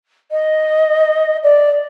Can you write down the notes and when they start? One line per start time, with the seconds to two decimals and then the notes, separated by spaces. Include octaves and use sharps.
0.31 D#5
1.43 D5